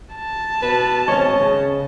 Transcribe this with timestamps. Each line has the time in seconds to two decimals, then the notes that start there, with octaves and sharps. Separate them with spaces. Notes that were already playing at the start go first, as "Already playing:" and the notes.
0.16 A5
0.62 B2 B4
1.08 G#1 C#4 C#5 D#5
1.40 C#3